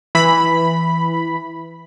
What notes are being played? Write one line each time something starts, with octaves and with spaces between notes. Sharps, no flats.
E3 B5